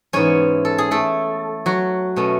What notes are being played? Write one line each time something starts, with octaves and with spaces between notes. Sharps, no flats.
G#2 E3 B3 C#4 C#5
A4
G#4
A3 A4
F#3 F#4
B2 A3 C#4